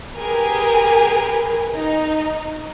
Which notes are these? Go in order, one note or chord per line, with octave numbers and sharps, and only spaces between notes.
G4 G#4 A#4 B4 G#5
D#4